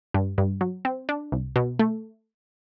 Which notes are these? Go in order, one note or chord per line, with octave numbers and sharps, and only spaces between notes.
G2
G2
F#3
C4
D4
C2
B2
A3